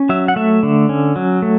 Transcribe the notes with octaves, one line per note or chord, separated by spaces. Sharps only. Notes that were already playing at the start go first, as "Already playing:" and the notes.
Already playing: C#4
F#3 E5
F#5
A3 E5
D3
C#4
F#3
A3